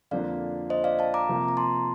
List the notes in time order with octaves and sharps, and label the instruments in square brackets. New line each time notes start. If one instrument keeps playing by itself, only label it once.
[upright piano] F2 D3 F3 A#3 D4 [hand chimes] D5 F5
[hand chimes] C5 D#5
D5 F5
F5 A5
A#5 D6
[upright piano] C3 F3 A#3
[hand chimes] A#5
A5 C6